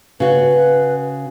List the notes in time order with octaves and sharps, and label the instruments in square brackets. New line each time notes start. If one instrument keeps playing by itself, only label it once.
[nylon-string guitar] C#3 F#4 [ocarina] B4